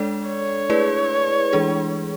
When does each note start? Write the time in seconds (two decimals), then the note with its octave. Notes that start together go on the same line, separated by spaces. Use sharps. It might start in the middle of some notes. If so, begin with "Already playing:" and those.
Already playing: G#3 D4 A4 D5
0.28 C#5
0.70 A3 E4 G#4 B4 D5
1.53 E3 G#3 D4 G#4